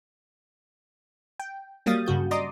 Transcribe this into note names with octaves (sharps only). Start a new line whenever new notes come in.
G5
F#3 G3 A#3 F5 D#6 A6
G2 C#3 F#4 G6
D5 D#5 A#5 C6 D6 D#6